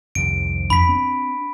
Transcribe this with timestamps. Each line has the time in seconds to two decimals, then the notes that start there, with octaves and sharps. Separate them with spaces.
0.15 C2 F2 D#3 D7
0.70 F2 D4 B5 B6
0.89 C4